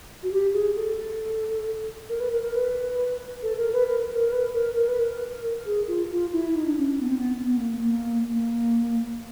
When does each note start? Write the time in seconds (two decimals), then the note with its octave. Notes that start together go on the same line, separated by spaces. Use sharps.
0.23 F#4
0.31 G4
0.53 G#4
0.76 A4
2.09 A#4
2.20 B4
2.32 A#4
2.42 A#4
2.54 B4
3.43 A4
3.58 A#4
3.73 B4
3.87 A#4
4.20 A#4
4.32 B4
4.54 A#4
4.76 A#4
4.88 B4
4.99 A#4
5.65 G#4
5.88 F4
6.10 F4
6.32 E4
6.55 D#4
6.66 D4
6.77 C#4
7.00 B3
7.08 C4
7.17 B3
7.43 B3
7.57 A#3
7.83 A#3
8.33 A#3